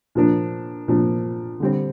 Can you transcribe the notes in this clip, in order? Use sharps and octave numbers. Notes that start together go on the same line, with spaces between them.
A#2 F3 A#3 D4
A#2 F3 A#3 D4
D3 G3 C4